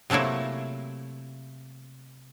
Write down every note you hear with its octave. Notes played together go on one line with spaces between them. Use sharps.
C3 F#3 A3 A#3 E4